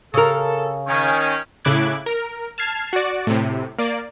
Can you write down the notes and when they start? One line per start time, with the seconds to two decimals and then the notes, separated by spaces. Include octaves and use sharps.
0.14 C#3 A4 A#4
0.88 D#3 C#4
1.65 A2 C#3 E4 D6 F#6 G#6
2.06 A#4
2.58 A5 F6 G#6 C7
2.93 F#4 D5
3.27 A2 C3
3.79 A#3 D5